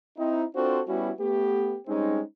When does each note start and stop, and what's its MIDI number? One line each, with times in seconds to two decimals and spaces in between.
0.18 0.44 60
0.18 0.44 63
0.18 0.44 64
0.55 0.81 60
0.55 0.81 62
0.55 0.81 65
0.55 0.81 66
0.55 0.81 69
0.55 0.81 72
0.88 1.10 55
0.88 1.10 59
0.88 1.10 61
0.88 1.10 64
0.88 1.10 66
1.19 1.76 57
1.19 1.76 59
1.19 1.76 67
1.87 2.21 55
1.87 2.21 56
1.87 2.21 60
1.87 2.21 61
1.87 2.21 63